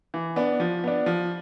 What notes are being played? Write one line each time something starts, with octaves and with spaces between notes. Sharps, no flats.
E3
B3 D4
F3
B3 D4
F3